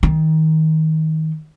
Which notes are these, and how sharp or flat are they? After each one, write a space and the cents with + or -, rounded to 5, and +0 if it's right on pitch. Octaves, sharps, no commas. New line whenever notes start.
D#3 +25 D#4 +15